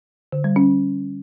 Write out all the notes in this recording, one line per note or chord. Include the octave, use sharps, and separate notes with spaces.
D3
G3
C#4